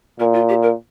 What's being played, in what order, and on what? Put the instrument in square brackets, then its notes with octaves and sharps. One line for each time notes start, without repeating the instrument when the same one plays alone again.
[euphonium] A#2 [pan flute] A#4
[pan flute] F4
G4
A#4